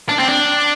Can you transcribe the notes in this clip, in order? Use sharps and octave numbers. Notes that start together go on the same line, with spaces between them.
D4
C4
D4